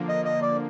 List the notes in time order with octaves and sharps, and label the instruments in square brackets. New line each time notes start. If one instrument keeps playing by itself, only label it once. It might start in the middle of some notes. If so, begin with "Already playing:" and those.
Already playing: [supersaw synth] D3 F3 A#3
[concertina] D#5
D#5
D5